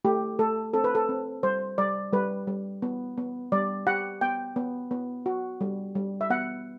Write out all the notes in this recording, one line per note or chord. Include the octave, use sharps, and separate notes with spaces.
A3 G4
A3 A4
C4 A4
B4
A4
C4
G3 C5
G3 D5
G3 B4
G3
B3
B3
G3 D5
G4 F#5
B3 G5
B3
B3
F#4
G3
G3
E5
B3 F#5